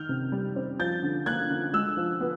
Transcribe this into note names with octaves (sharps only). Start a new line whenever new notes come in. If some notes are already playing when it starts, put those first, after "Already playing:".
Already playing: D#3 F6 G6
C3
G3
C4
F3 G6 A6
D3
A#3 F#6 G#6
D3
G#3 E6 F#6
F3
B3